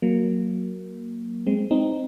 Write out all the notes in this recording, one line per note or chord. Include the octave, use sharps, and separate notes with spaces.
F#3 A#3
G#3 C4
C4 D#4